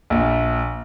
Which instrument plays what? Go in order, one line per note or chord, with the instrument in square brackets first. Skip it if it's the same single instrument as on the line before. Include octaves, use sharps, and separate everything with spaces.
[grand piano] A#1